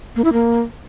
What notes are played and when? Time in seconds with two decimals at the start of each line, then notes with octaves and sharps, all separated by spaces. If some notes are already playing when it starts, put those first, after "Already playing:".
0.16 A#3
0.24 E4
0.33 A#3